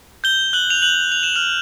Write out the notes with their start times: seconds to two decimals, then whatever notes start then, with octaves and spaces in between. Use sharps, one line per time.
0.24 G6 G7
0.53 F#6 F#7
0.70 F7
0.82 F#6 F#7
1.12 F7
1.23 E7
1.36 F6 F7